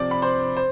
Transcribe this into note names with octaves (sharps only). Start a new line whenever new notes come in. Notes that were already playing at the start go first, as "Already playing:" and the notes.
Already playing: C3 F3 C4 D5 D6
B5
C5 C6
C5